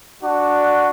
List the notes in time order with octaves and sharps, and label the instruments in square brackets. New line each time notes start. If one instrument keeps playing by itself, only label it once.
[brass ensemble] D4 F#4